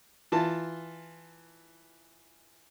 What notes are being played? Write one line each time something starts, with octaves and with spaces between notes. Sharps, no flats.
E3 F4 A5